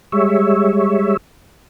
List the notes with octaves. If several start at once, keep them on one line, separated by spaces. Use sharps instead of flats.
G3 G#3 C#5 E5